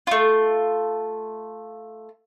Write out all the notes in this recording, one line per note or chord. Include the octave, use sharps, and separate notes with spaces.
A3 F4